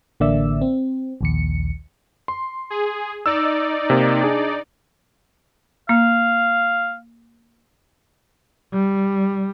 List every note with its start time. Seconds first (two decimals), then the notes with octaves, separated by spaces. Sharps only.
0.20 A1 D3 A#3 D5 E5 E6
0.61 C4
1.21 A#1 D#2 C#7
2.28 C6
2.70 G#4
3.26 D#4 D5 E6
3.90 C3 A#3
4.23 D4 G#4
5.89 A#3 F5
8.73 G3